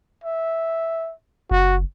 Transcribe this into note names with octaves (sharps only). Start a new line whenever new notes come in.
E5
F#1 F#4